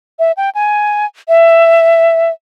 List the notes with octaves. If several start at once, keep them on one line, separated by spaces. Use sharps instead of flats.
E5
G5
G#5
E5